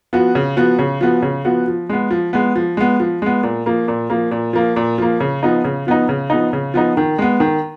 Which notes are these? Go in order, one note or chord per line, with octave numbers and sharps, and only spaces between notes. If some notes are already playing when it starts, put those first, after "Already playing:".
F3 B3 F#4
C#3
F3 B3 F#4
C#3
F3 B3 F#4
C#3
F3 B3 F#4
F3
G#3 B3
F3
G#3 B3
F3
G#3 B3
F3
G#3 B3
A#2
F3 A#3
A#2
F3 A#3
A#2
F3 A#3
A#2
F3 A#3
C#3
F3 B3 D#4
C#3
F3 B3 D#4
C#3
F3 B3 D#4
C#3
F3 B3 D#4
D#3
G#3 B3
D#3